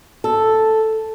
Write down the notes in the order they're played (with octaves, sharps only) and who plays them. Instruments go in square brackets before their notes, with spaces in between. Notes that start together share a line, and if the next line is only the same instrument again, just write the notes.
[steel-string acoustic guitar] A4